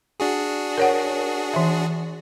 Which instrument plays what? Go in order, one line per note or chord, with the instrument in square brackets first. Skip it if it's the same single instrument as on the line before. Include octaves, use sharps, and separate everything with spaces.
[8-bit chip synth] D4 F#4 G#4
[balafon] A#4 C#5 F#5
E3 E5